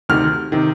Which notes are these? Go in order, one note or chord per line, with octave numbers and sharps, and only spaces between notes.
D2 C3 D#3 F6
C3 D#3